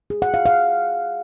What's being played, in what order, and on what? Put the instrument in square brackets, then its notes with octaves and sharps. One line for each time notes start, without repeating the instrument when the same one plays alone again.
[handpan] G#4
F#5
F5
F5